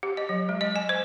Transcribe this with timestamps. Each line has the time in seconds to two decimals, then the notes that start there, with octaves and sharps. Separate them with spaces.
0.03 G4
0.17 D#5
0.29 F#3
0.49 G#3
0.61 D#5
0.76 G#5
0.89 C5